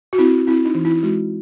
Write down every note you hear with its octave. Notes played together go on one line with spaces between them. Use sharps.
F#4
C4 E4
C4 E4
D#4
E3
E4
G#3 F#4